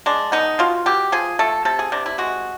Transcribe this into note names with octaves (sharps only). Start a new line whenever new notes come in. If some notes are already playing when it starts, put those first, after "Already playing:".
G#3 D4
B3 D#4
B2 F4
B2 G4
F3 G#4
A3 A4
C3 A4
G#4
C3 D4
E4
G#3 F#4